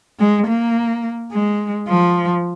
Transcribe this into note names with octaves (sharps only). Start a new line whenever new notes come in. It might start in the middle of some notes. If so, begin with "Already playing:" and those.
G#3
A#3
G#3
F3